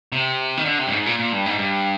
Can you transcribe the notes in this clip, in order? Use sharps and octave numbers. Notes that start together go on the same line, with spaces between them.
C3
D#3
D3
C3
G2
G#2
A#2
A#2
G2
G#2
G2